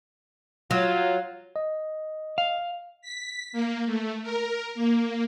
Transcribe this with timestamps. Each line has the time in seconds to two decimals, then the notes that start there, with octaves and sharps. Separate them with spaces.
0.71 F#3 F4
1.56 D#5
2.38 F5
3.02 B6
3.53 A#3
3.86 A3
4.23 A#4
4.75 A#3